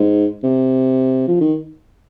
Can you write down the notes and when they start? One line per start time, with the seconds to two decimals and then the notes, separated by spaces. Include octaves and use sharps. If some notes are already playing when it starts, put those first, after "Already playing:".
Already playing: G#2
0.43 C3
1.28 F3
1.41 D#3